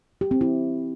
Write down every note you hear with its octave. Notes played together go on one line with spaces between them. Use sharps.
G4
C4
E4